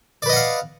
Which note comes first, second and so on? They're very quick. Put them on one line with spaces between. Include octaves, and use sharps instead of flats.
D5 B4 D#5 F#5 F5